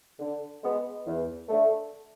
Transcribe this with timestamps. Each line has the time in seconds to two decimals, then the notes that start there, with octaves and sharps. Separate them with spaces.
0.19 D3
0.63 G#3 B3
1.06 E2
1.49 D3 A3